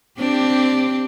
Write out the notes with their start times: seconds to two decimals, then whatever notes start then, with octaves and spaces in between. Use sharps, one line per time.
0.18 C4 D4 G4